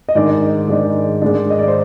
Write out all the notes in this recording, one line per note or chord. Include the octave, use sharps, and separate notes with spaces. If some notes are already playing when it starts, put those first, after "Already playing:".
D#5
G#2 D#3 G#3 D4 D5
G#2 D#3 G#3 D4
G#2 D#3 G#3 D4
D#5
D5
C5